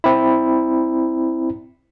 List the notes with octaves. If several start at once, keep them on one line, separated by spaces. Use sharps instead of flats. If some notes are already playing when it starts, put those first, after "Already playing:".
C4 E4